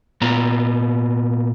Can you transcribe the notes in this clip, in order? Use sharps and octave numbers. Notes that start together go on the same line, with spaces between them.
A#2 B3 A#5